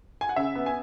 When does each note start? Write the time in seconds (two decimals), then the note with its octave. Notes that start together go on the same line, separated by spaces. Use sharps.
0.21 G#5
0.29 F#5
0.36 C#3 E5
0.55 B3
0.66 G#5